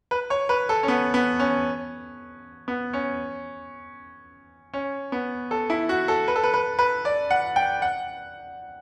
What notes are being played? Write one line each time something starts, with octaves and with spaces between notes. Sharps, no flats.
B4
C#5
B4
A4
C#4
B3
B3
C#4
B3
C#4
C#4
B3
A4
E4
F#4
A4
B4
A4
B4
B4
B4
D5
F#5
G5
F#5